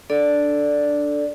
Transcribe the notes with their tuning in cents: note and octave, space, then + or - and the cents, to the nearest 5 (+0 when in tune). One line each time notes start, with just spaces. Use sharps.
D4 +0 A4 +0 D5 +0